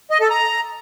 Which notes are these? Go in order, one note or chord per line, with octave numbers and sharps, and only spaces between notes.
D#5
A4
A#5